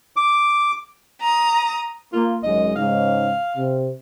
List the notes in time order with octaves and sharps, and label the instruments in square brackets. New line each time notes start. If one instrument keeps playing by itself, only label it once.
[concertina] D6
[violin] A#5 D#6
[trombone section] A#3 [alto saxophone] F4
[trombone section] G#1 F#2 G#3 [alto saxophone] D#5
[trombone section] G#2 C#3 [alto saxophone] F5
[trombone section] C3